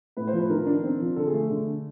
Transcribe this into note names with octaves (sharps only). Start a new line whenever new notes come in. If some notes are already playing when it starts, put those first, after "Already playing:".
A2 B4
C5
F3
B4
D#3 A#4
D4
C4
F3
D3 A4
G#4
A3
D3